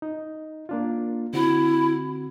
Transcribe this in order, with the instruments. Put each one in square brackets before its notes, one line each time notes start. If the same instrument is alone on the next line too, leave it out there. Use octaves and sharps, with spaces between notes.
[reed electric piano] D#4
A#3 D4 F4
[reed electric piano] D3 C4 F#4 [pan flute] E4